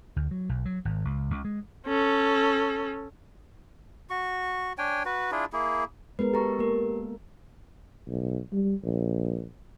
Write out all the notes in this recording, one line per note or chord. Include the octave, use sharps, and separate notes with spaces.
D2
F#3
B1
F#3
G#1
C#2
C#2
G#3
C#4 A4
F#4 C#6
D4 C#5 G5 G#5
F#4 B4
D4 E4 F4 G#4
A#3 E4 G#4
G#3 B3 A#4 B4
G4 A4 A#5 C#6
A#3 G4 A#4
B1
G3
A#1